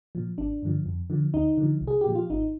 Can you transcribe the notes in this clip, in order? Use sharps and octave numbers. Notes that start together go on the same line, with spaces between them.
A#2 F3
G#1 D4
G2 D3 F3
F2
D3 F3
D2 D#4
D3 F3
C2
G#4
G4
A#2 F3
F4
G#1 D#4